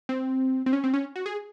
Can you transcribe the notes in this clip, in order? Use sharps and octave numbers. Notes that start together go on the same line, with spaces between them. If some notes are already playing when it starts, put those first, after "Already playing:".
C4
C4
C#4
C4
C#4
F#4
G#4